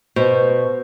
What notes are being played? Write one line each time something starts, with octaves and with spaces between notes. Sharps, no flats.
B2 F#4 C5 C#6